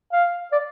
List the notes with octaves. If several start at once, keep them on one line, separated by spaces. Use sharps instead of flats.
F5
D5